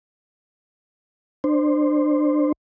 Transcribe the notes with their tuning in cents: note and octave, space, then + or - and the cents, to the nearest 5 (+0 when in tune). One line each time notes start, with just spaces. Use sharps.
D4 +25 C5 +0